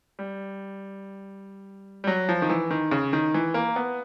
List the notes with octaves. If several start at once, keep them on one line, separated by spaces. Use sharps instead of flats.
G3
G3
F#3
F3
D#3
E3
D#3
C#3
D#3
E3
A#3
B3